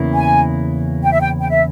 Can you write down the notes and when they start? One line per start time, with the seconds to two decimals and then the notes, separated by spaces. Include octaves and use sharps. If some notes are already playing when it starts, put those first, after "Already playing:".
Already playing: E2 C#3 E3 A#3 E4
0.13 G#5
1.03 G5
1.11 E5
1.20 G5
1.40 G5
1.49 E5